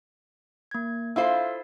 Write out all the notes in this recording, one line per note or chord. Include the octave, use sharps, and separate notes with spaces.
A#3 G#6
E4 F4 A4 C5 F5 E6